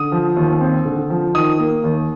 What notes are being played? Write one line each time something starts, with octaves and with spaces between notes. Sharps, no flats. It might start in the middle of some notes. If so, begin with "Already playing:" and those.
Already playing: D3 D#6
F3
D#2
C4
D3
F3
D#3 D#6
A#3
D#2